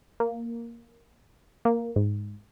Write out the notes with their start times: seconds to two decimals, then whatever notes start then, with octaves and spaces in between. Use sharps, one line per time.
0.20 A#3
1.65 A#3
1.96 G#2